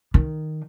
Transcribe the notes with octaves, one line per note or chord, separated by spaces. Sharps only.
D#3